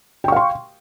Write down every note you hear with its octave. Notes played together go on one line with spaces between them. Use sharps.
F5 G5 C6 C#6